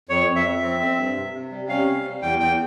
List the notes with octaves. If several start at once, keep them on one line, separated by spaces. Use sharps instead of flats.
F2 C#5
F2
E5
F2
C4
C4
G2
C3
C3
G3
C#4 F5
C3
G3
E2 G5
E2 G5